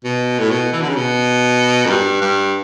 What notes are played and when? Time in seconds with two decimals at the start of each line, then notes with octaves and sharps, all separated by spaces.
0.04 B2
0.39 A2
0.51 B2
0.73 E3
0.82 D3
0.89 C#3
0.97 B2
1.86 F#2
1.90 G2
2.21 G2